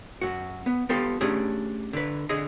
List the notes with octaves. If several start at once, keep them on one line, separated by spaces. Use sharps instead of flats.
F#2 F#4
B3
B3 F4 G4 A4
A3 C#4 D4 G4 G#4
D3 B4
D3 G#4 D#5